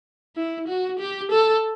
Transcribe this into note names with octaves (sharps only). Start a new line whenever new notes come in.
E4
F#4
G4
A4